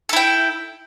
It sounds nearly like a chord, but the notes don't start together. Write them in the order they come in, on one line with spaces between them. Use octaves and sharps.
A4 E4 G5